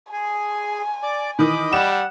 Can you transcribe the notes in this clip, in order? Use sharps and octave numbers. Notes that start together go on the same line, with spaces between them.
G#4 G#5
D5 D6
D#3 E3 D#5 B5 D6 D#6
G3 F#5 E7